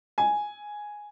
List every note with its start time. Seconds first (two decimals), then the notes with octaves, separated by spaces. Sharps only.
0.18 G#5